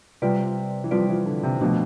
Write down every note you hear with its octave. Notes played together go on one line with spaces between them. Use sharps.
C3 G3 C4 F4 B4 D5
E3
F3 G3 C4 F4 B4 D5
E3
D3
C3
B2 F3 A3 D4